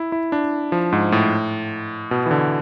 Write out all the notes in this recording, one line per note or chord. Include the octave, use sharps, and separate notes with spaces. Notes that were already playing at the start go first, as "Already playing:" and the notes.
Already playing: E4
E4
D4
F3
G#2
A2
B2
E3
D3